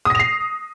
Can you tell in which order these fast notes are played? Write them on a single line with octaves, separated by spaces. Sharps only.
D#6 A#6 F7 C7